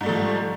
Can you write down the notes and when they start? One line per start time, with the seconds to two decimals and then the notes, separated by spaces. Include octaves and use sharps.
0.01 G#2
0.03 G3
0.06 A3
0.09 F3